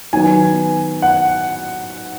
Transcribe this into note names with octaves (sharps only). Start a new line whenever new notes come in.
D#3 F#3 B3 G#5
F#5